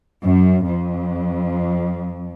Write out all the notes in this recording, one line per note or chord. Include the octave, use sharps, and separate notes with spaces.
F#2
F2